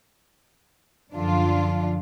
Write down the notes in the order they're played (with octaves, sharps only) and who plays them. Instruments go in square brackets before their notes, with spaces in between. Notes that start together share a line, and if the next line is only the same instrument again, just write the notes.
[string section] F#2 D3 F3 D4 F4